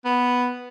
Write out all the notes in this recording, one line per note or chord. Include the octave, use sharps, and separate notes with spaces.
B3